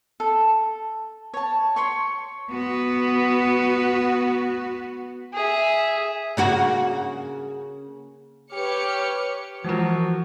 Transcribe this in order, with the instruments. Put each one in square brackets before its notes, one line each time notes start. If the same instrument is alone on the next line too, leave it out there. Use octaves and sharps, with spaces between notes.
[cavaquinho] A4
C#5 A5
C#5 C6 C#6
[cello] B3 F#4
[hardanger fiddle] G#4 E5
[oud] C#3 A#3 F#4
[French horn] G4 [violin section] B4 C#5 C#7 [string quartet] D6 F6
[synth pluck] E3 A#4 [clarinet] F3 [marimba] G#3 F4 [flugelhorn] F#4